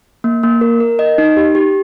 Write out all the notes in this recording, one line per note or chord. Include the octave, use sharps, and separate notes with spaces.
A#3
A#3
A#4
A#4
D#5
D#4
G4
G4